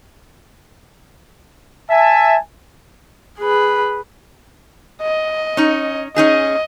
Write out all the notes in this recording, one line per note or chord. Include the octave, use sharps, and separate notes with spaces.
E5 G#5 A5
G#4 B4
D#5
C#4 D#4
C#4 D#4 G#4 D#5